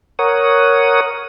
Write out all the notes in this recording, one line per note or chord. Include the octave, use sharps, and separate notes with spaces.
A#4 C#5 F#5 D#6